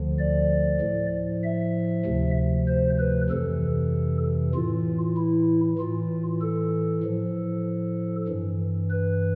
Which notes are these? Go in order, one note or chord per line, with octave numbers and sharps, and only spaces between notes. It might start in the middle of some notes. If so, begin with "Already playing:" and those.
Already playing: D2 D3 F3
D5
A2 F3
E5
D2 C3 F3
C5
B4
F2 C3 E3 A4
A2 E3 F4
E4
A2 E3 F4
A4
A2 F3
G2 E3
B4